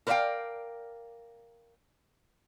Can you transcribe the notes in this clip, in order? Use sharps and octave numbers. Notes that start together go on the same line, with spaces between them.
A#4 B4 D5 E5 F5 G5